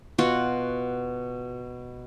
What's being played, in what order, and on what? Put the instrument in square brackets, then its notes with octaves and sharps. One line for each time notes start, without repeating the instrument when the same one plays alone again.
[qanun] B2 F4 F#4 F#5